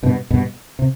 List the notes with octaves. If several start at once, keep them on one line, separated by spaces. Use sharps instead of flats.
G2 B2
G2 B2
C3